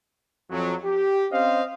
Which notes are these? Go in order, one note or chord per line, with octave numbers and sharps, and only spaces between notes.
F2 F#3
G4
C4 C#4 C5 D#5 F5